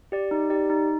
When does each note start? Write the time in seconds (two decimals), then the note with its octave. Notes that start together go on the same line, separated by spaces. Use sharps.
0.12 G4 D5
0.31 D#4
0.50 G4 D5
0.70 D#4